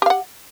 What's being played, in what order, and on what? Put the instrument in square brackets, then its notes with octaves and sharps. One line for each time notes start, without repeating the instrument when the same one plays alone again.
[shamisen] G4
F5
F#5